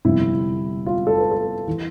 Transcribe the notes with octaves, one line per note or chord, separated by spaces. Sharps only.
G1 F2 C3 E4
F4
A4
B4
A4
E3